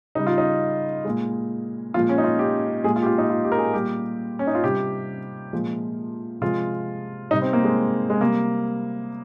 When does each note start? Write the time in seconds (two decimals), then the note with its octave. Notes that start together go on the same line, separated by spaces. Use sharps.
0.15 C#3 G3 D#4
0.27 F4
0.38 D#4
1.05 A#2 G#3
1.94 A#2 F3 G#3 F4
2.09 C#4
2.18 D#4
2.24 F4
2.39 G4
2.84 A#2 G#3 G#4
2.96 F4
3.03 G4
3.06 F4
3.18 D#4
3.29 F4
3.44 G4
3.52 A#4
3.58 G#4
3.73 A#2 G3 G4
4.39 C#4
4.47 D#4
4.55 F4
4.64 C3 G3 G4
5.53 A#2 F3 G#3
6.41 C3 F3 G#3 F4
7.31 G3 D#4
7.33 C3
7.42 C4
7.53 A#3
7.64 G#3
8.10 G#3
8.21 C3 G3 A#3